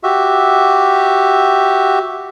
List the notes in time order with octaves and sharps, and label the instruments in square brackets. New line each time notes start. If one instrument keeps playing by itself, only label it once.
[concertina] F#4 G4 E5